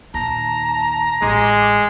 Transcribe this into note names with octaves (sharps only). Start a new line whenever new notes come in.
D#2 A#2 A5 A#5
A1 G#3 D6